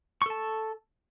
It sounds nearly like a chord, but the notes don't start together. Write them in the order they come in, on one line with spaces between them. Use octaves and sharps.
C#6 A4 A5